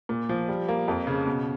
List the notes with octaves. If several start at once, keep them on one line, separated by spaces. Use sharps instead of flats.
A#2
F3
G3
A#3
F2
C#3
B2